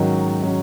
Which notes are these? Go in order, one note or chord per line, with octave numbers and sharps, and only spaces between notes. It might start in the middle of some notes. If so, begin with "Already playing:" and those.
Already playing: G#2 D#3 F#3 C#4
D#3 F#3 C#4